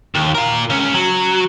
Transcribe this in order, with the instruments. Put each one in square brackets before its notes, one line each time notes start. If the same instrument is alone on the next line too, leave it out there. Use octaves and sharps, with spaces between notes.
[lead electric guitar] D#2
F4 A#4
C#2 C#4
F#3